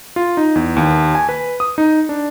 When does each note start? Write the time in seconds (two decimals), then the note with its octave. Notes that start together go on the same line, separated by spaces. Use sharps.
0.16 F4
0.37 D#4
0.56 E2
0.77 D#2
1.15 G#5
1.29 B4
1.60 D#6
1.78 D#4
2.09 D4